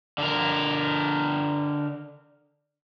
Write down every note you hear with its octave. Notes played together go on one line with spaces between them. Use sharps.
D3 A#4